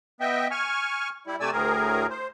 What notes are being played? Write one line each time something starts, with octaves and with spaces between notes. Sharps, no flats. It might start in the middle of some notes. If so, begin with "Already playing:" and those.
B3 D#5 E5 G5
G#5 C#6 F6
G3 E4
C3 A3 D5 G#5 E6
D2 A2 G#4 A#4
C5